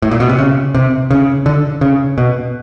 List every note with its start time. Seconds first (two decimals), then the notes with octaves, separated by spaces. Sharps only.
0.02 A2
0.11 A#2
0.20 B2
0.29 C3
0.38 C#3
0.75 C3
1.11 C#3
1.46 D3
1.81 C#3
2.18 B2